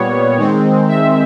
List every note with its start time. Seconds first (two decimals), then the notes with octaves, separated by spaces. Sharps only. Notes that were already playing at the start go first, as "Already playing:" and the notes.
Already playing: A#2 G3 B3 C#5
0.37 D#3 G#3 C4
0.89 E5